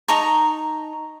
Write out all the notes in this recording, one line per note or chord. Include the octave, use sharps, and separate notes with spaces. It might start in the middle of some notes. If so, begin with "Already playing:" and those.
D#4 A5 A#5 C#6